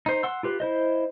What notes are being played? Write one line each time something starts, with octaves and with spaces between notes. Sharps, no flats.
D#4 C5
F#5 C6 E6
F4 G4 B4
E4 C5 D#5